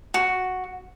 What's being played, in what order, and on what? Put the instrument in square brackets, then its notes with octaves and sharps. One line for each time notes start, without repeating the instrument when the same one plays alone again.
[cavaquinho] F#4